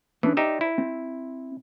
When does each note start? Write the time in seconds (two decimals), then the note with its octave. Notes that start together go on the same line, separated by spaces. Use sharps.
0.23 E3 B3 C#4 D4
0.37 D#4 G4 C5 D5 E5 A#5
0.61 E4
0.78 C4